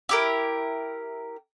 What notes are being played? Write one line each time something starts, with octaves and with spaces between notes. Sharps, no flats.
E4 G4 A#4